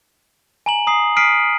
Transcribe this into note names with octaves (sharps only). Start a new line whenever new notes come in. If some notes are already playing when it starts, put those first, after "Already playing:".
G#5 A#5 F#7
A#5 D#6 C7
D#6 F6 B6 C7 D7 D#7